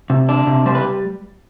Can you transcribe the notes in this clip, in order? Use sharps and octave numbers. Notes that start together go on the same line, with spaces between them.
C3
D4
C3
G3 C5
B4